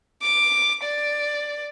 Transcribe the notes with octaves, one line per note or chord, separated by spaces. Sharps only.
D6
D5